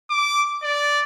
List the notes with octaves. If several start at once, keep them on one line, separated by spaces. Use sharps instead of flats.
D6
D5